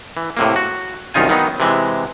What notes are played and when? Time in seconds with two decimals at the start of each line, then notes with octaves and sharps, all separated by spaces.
0.17 E3
0.37 A2 C3 A#3
0.56 F#4
1.14 C2 F#2 D#3 D#4 F4 G#5
1.29 D#3 F#3 B3 D#4
1.60 C3 E3 G#3